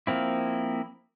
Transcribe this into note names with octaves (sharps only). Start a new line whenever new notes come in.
F3 A#3 C4 E4